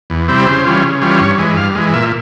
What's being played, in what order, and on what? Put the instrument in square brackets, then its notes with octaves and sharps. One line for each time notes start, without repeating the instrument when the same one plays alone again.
[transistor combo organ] E2
C3 G3 C4 E4
C#3 C5
E3 G3 C#4 F4
C#3
E3 G3 C#4 F4
G2 C#5
E3 G#3
G2 F5
E3 G#3
A#2 E5